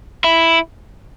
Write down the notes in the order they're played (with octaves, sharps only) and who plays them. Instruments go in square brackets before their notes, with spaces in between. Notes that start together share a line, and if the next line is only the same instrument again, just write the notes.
[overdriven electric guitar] E4